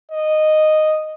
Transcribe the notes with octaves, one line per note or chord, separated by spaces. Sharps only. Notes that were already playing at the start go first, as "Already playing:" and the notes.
D#5